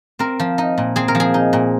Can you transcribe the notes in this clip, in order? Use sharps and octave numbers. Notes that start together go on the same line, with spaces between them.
C4 A#4
F3
D#4
A#2
C4 G#4
A#4
F3
G#4
D#4
A#2